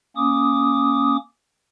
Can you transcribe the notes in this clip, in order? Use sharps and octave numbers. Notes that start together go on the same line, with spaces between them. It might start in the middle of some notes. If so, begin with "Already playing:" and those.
A#3 C#4 D6 D#6